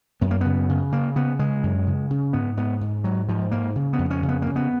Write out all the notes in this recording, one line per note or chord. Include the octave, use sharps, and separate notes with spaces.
F#2 B3
A#3
C#3 B3
C#3
C#3 A#3
C#3 B3
C#3 G#3
F#2
C#3
C#3
G#2 B3
G#2 B3
G#2
G#2 F#3
G#2 F3
G#2 A#3
C#3
B3
F2
C#4
C#3
B3
C#3 A#3
B3